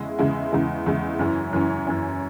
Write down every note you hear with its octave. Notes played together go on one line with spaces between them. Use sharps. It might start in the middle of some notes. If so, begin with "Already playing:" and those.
Already playing: E2 C#3 G#3 E4
E2 C#3 G#3 E4
E2 C#3 G#3 E4
E2 C#3 G#3 E4
F#2 E3 C#4
F#2 E3 C#4
F#2 E3 C#4